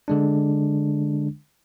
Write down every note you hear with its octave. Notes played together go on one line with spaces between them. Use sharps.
D3 G#3 D4